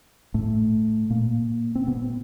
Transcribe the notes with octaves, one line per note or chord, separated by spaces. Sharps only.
A2 A3
A#2 A#3
C4
B2 B3